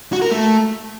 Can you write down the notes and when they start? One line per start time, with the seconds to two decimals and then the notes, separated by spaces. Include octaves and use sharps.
0.12 F#4
0.22 A#4
0.31 A3